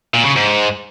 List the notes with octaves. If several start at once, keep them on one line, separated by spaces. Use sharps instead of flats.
A#2
C#3
G#2